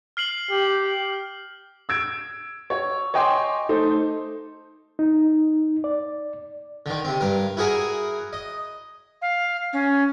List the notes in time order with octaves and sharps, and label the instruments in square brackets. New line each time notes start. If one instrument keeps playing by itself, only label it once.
[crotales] F6 C7 F#7
[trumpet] G4
[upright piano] E6 G#6 D7
C#5
C#5 D#5 G5 G#5 C6 D6
A3 D#4 A4 C5
[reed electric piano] D#4
D5
[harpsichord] D3 D#3
C3 C4
G2 A#4
E4 F#4 G#4 A#4 G#5
D#5
[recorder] F5
C#4